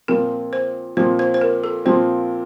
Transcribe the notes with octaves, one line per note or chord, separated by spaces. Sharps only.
A#2 F3 C4 A#4
C5
A#2 F3 C4 C5
C5
C5
A#4
A4
A#2 F3 C4 C5